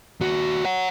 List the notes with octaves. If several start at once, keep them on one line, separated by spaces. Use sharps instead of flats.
D#2 F#4
C#5 F#5